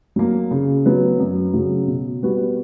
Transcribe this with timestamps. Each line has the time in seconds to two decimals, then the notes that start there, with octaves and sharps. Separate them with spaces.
0.16 F#3 A#3
0.51 C#3
0.86 F#3 B3
1.19 F#2
1.53 C#3 F#3
1.88 B2
2.23 G3 B3 F#4